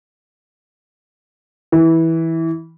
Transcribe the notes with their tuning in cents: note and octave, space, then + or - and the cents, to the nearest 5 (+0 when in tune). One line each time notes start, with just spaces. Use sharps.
E3 -15